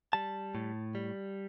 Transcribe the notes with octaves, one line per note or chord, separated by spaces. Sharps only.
G3 A5
A2
G3